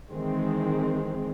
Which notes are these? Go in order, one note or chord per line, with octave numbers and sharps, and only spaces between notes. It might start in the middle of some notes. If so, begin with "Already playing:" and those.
D#3 E3 G#3 C4